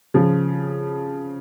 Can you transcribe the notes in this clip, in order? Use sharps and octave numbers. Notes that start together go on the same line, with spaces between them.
C#3 F3